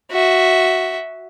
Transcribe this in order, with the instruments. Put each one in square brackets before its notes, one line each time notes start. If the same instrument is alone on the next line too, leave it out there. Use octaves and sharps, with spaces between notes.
[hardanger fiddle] F#4 E5